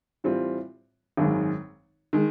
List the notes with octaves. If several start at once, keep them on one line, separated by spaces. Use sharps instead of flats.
A2 E3 G3 C4 F4
G#1 F#2 D#3 G#3
D#3 G#3